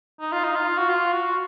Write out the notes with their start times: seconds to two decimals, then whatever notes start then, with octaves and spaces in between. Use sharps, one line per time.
0.20 D#4
0.32 F4
0.44 D#4
0.55 F4
0.78 F#4
0.89 F4
1.13 F#4